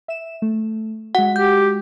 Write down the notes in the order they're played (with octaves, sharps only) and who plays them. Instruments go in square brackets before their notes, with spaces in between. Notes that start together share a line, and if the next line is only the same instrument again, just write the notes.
[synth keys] E5 E7
A3
[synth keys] G#3 F#4 [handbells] F#5
[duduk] G4 [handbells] G6